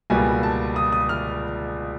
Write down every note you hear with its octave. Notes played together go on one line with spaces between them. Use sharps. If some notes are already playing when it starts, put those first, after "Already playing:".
C#2 B2 G3 A#3 G#5
A5
D#6
D#6
F6